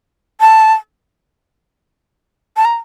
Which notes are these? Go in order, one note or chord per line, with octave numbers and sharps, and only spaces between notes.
A5
A5
A#5